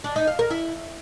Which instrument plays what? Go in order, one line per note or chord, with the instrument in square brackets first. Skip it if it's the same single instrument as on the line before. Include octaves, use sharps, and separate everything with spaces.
[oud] D4
D#4
F5
A#4
E4